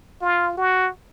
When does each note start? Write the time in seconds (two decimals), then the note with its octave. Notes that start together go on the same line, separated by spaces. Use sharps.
0.21 F4
0.57 F#4